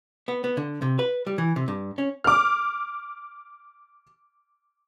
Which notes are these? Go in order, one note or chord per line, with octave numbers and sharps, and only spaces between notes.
B3
B3
D3
C3
B4
G3
E3
C3
G2
C#4
D6 F6